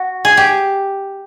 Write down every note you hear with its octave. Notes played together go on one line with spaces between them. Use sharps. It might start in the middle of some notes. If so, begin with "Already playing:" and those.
Already playing: F#4
G#4
G4